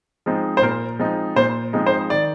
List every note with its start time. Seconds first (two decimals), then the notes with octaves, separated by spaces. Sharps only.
0.26 F3 G#3 C4 D#4
0.57 C5
0.62 A#2 A#4
0.99 F3 G#3 C4 D#4
1.36 A#2 C5
1.73 F3 G#3 C4 D#4
1.87 C5
2.10 D#3 D5